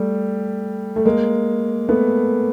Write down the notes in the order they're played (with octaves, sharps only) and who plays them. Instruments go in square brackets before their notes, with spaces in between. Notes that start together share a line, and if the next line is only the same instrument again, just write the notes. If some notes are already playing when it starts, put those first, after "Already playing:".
Already playing: [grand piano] G3 A3
A3
G#3 A#3
A3 B3